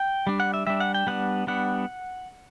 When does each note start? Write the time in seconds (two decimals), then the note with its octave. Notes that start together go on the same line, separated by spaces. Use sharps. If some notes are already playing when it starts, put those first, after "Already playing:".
Already playing: G5
0.27 G3 D4
0.40 F#5
0.54 E5
0.67 G3 D4 E5
0.80 F#5
0.94 G5
1.07 G3 B3 D4 F#5
1.47 G3 B3 D4 F#5